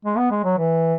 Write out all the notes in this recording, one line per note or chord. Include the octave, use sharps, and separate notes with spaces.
G#3
B3
G#3
F#3
E3